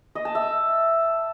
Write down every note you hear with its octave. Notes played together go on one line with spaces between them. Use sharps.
D#5
A5
E5